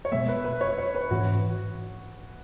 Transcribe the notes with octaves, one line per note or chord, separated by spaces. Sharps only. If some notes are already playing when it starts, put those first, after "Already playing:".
C#5
B2 G#3 B3 E5
B4
B4
C#5
C#5
B4
G#2 E3 C#4 F#4